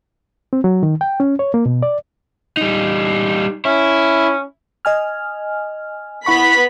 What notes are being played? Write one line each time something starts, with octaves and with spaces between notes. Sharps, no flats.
C4
F#3
D#3
G5
C#4
C#5
A#3
B2
D5
G3 D#4
C#4 E4
D#5 G#5 F6
B3 E4 F#5 B5 C#6 B6